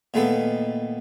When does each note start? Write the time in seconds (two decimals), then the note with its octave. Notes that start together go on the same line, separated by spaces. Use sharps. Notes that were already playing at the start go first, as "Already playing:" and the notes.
0.14 A#2 D#3 G#3 A3 B3 A4